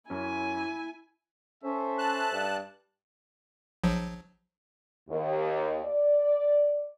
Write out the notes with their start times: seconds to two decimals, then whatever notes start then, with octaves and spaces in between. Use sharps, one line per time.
0.10 F#2 C#4 E4 G#5
1.64 C#4 A4 C5 E5
1.98 A5 F#6
2.33 G2
3.84 A#1 F3 F#3
5.09 D#2
5.85 D5